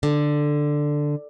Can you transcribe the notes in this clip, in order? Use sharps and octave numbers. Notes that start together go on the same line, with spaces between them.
D3